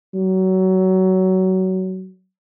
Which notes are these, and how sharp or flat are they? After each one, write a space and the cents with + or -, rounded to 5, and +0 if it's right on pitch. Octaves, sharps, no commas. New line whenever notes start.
F#3 +20